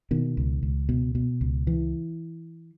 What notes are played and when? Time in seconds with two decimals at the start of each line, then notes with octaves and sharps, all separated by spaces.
0.11 B2 D#3
0.37 C#2
0.63 C#2
0.89 B2
1.15 B2
1.41 C#2
1.67 E3